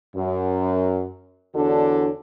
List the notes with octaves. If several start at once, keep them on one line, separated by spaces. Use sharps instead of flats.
F#2
E2 D3 D4 F#4 A4 C#5